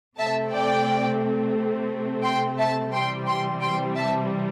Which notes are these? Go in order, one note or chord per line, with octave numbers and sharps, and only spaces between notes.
C3 A3 C4 E5 A5
D5 G5
G5 C6
E5 A5
C3 E3 G3 C4 G5 C6
G5 C6
G5 C6
E5 A5